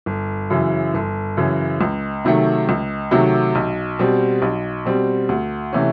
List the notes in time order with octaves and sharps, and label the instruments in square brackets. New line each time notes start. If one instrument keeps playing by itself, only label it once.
[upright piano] G1
F#2 C#3 E3
G1
F#2 C#3 E3
C#2
C3 D#3 F#3 A3
C#2
C3 D#3 F#3 A3
B1
B2 G3 C4
B1
B2 G3 C4
D2
C3 E3 A3 C#4